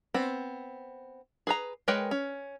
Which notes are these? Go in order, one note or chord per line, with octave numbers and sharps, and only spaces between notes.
B3 C4
G#4 B4 A#5
G#3 A#4 B4 C#5 G5
C#4